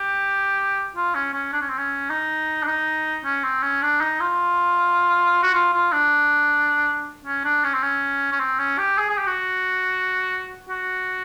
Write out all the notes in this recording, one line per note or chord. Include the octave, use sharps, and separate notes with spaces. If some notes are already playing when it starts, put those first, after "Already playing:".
Already playing: G4
F4
C#4
C#4
D4
C#4
C4
C#4
D#4
D4
D#4
C#4
C4
C#4
D4
D#4
F4
F#4
F4
F4
D4
C#4
D4
C#4
C4
C#4
C#4
C4
C#4
G4
G#4
G#4
G4
F#4
F#4